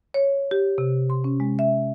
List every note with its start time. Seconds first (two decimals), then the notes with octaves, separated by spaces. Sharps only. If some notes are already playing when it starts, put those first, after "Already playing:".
0.14 C#5
0.51 G4
0.78 C3
1.10 C6
1.24 C#4
1.40 G#3
1.59 E5